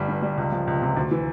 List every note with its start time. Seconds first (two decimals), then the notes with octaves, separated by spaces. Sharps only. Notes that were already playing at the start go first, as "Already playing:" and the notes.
Already playing: G1 G3
0.08 G2
0.22 G3
0.37 C#2
0.52 F3
0.67 C#2
0.82 C3
0.97 D2
1.11 E3